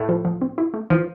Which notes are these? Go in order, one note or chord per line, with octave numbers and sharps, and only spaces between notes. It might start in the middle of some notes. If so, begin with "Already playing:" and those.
Already playing: A2 A3
F3
F3
C4
E4
A3
E3 F3